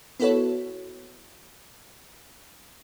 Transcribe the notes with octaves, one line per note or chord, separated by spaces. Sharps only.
B3 E4 F#4 A4 B4 C#5